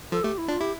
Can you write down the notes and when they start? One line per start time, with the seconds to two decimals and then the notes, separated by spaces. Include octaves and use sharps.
0.12 F3 A4
0.24 A3 G4
0.38 E4
0.48 D4 F4
0.60 E4 G4